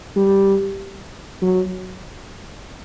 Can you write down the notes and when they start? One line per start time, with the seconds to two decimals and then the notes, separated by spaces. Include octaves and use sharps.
0.16 G3
1.42 F#3